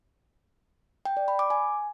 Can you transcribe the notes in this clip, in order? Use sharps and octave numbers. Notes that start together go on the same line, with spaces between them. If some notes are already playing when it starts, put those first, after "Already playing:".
G5
D5
B5
D6
G#5